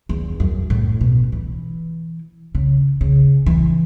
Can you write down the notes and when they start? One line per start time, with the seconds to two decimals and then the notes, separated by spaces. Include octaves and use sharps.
0.09 E2
0.40 F#2
0.70 A2
1.01 B2
1.32 E3
2.55 C#3
3.01 C#3
3.46 E3